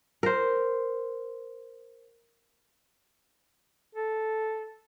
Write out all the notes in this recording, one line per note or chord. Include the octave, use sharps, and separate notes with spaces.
A#4 C5
A4